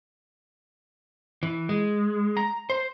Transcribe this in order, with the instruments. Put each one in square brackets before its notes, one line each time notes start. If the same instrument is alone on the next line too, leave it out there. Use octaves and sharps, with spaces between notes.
[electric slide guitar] E3
G#3
A#5
C5